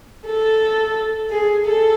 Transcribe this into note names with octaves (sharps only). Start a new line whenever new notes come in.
A4
G#4
A4